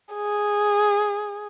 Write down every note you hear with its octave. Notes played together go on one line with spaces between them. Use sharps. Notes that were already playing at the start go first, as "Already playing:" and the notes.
G#4